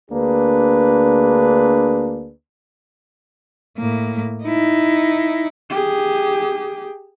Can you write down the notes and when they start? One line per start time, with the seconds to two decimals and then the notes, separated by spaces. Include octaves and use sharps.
0.10 D2 A#3 D4 G#4 B4
3.77 A2 A#3
4.44 D#4 E4
5.70 G4 G#4